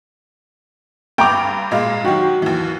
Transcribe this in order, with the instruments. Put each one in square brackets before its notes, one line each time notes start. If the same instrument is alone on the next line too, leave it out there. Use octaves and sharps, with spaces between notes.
[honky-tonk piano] G2 [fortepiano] G5 A#5 D6
[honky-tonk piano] A#2 G#3 F4
[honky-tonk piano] D#3 F#3 G4 [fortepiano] F#4
[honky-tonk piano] D#2 E3